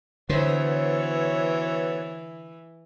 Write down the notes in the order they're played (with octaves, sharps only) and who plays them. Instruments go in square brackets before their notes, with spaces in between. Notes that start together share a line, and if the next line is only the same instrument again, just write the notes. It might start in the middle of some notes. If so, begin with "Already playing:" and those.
[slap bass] D3 [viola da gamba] E3 [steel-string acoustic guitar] B3 C5 [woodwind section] F#4 A4 C#5